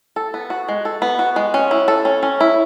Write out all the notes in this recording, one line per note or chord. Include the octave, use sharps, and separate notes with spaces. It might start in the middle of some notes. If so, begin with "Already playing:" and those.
A4
B3
F#4
G#3
A4
B3
F#4
G#3
C#4
E4
A4
C#4
C#4
E4